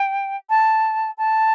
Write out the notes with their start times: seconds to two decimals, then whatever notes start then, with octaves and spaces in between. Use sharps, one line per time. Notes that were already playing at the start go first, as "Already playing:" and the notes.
Already playing: G5
0.49 A5
1.18 A5